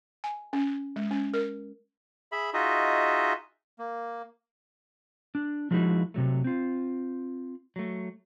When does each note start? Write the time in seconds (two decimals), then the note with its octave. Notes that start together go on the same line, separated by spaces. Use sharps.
0.24 G#5
0.53 C#4
0.96 G#3
1.11 C#4
1.34 A#4
2.32 G#4 E5 B5
2.53 D#4 F4 F#4 G#4 D#5 E5
3.79 A#3
5.35 D4
5.71 F3 F#3 G#3 D#4 E4 F#4
6.14 C3 F#3 A3
6.44 C4 F4
7.76 F#3 A3